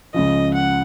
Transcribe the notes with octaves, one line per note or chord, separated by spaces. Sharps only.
C#2 C#3 F3 D#5
F#5